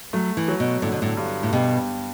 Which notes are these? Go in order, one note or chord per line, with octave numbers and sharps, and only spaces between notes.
F#3 A3
E3
F#3
B2
A2 D3
B2
A2
G2
A2
B2 G4